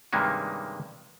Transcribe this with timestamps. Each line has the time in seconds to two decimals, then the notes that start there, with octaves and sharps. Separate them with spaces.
0.13 G2 C3 D#3 G#3 A#3 C#4